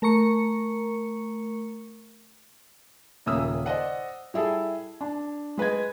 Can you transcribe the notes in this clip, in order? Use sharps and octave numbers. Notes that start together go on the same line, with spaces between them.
A3 A#4 A#5 C#6 C#7
D#1 C#3 A#3 E5 D#6 E6
C5 D5 D#5 F#5
G3 E4 G#4 A4
D4
G#3 B4 D#5 G#6